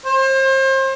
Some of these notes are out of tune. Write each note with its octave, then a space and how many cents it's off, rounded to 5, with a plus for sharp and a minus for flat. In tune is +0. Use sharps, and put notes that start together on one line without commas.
C5 +35